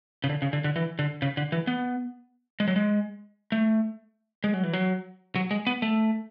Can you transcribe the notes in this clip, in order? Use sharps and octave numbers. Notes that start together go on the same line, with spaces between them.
C#3
D3
C#3
D3
D3
E3
D3
C#3
D3
E3
B3
G#3
F#3
G#3
A3
G#3
F#3
E3
F#3
F#3
G#3
B3
A3